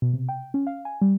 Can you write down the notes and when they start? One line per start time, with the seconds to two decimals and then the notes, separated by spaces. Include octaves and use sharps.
0.02 B2
0.13 C3
0.29 G5
0.54 C#4
0.67 F5
0.85 G#5
1.01 G3